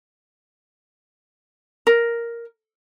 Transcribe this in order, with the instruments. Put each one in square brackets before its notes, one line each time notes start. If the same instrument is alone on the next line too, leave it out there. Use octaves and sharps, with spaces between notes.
[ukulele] A#4